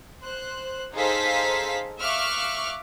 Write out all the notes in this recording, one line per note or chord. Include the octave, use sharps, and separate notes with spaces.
C5 F#6
D#4 G#4 A4 C5 F5 B6
E5 F5 C#6 D6 F6 F#6